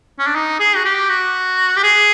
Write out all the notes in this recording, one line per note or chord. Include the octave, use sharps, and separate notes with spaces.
C#4
D4
D#4
G#4
F#4
G4
F#4
G4
G#4